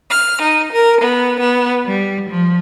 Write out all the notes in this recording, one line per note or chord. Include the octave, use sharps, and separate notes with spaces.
F6
D#4
A#4
B3
B3
G3
F3